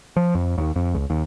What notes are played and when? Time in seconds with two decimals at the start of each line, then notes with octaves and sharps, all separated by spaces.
0.16 F3
0.35 F2
0.58 D#2
0.76 F2
0.94 C#2
1.10 D#2